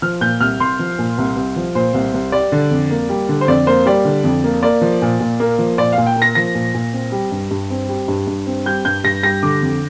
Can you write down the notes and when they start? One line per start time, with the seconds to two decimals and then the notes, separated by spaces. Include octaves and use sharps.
0.02 F3 F6
0.21 A#2 G6
0.41 C2 F6
0.60 C2 C6
0.79 F3
0.99 A#2
1.18 C2
1.36 C2
1.56 F3
1.75 A#2 C5
1.94 C2
2.14 C2
2.32 G3 D5
2.52 D3
2.71 F2
2.90 A#3
3.09 G3
3.29 D3
3.41 C5
3.48 F2 D5
3.67 A#3 C5
3.86 G3 D5
4.05 D3
4.24 F2
4.44 A#3
4.62 A#3 D5
4.81 F3
5.02 A#2
5.20 A#2
5.40 A#3
5.59 F3
5.78 A#2 D5
5.92 F5
5.98 A#2
6.06 G5
6.16 A#3
6.22 A#6
6.35 F3 A#6
6.55 A#2
6.74 A#2
6.93 C4
7.12 G3
7.32 G2
7.51 G2
7.70 C4
7.89 G3
8.08 G2
8.27 G2
8.47 C4
8.66 G3 G6
8.85 G2 G6
9.04 G2 A#6
9.23 G3 A#6
9.43 D3 D6
9.62 F2